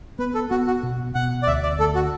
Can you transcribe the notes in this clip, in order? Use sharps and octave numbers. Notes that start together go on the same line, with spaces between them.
B3 B4
A4
B3 F#4
F#4
B2
B2 F#5
D5
D2 E5
D5
D2 A4
F#4